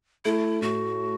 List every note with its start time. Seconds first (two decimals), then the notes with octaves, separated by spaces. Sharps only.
0.25 A3 E4
0.61 A2 F#4